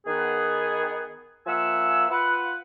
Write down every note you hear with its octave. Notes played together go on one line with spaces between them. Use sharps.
D#3 B3 G#4
F3 A#3 E5 F#5 G#5 E6
F4 B4 F#5